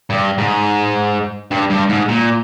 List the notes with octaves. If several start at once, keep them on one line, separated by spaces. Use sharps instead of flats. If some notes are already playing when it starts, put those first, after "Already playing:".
G2
G#2
G2
G2
G#2
A#2